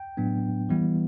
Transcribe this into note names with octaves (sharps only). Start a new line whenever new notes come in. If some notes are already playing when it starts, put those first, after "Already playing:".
Already playing: G5
A2 F#3 B3 D4
E3 G3 B3 E4